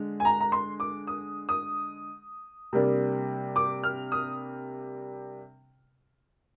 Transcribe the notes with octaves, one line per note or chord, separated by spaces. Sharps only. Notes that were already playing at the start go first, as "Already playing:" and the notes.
Already playing: D3 G#3
G#5
A#5
A#5
C6
D6
D#6
D#6
C3 G3 A#3 D4
D6
F6
D#6